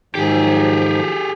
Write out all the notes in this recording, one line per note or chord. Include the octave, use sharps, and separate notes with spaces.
G#2 D#3 F3 F#3 G4 G#4